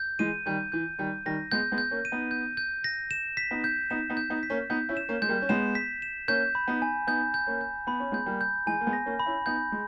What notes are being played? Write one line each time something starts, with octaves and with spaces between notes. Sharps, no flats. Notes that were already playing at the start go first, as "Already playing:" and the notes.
Already playing: G6
E3 G#3 D#7
D#3 G3 G6
E3 G6
D#3 G3 G6
D#3 G3 A#6
G#3 B3 G6
G#3 B3
G6
A#3 C#4
D#7
B3 D#4
G6
G6
A#6
E7
B6
B3 D#4
G6
B3 D#4 E7
B3 D#4
G6
B3 D#4
B6
A#3 C#4
B3 D#4 G6
C#4 E4
E7
A#3 C#4
G#3 G6
G3 A#3
C#4
G#3 B3 E7
B6
E7
A#3 C#4 G6
B5
B3 D#4
G#5
B3 D#4 G6
G6
A#3 C#4
G6
B3 B5
C#4
G#3 B3 G6
G3 A#3
G6
E3 G#3 G#5
A#3
G#3 B3
A#6
A#3 C#4
B5
C#4 E4
B3 D#4 G6
G#3